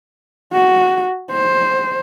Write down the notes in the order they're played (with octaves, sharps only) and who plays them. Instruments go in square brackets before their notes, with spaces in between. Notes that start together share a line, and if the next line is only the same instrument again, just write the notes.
[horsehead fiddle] F#4
C5